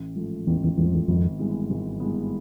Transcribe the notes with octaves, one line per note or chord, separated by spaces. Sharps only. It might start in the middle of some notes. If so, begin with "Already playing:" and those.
Already playing: A1
G#2 F3 A3
A1 E2
E2
E2 G#2 F3 A3
F2
E2
G#1 F2
G2 E3 G#3 B3
G#1
G2 E3 G#3 B3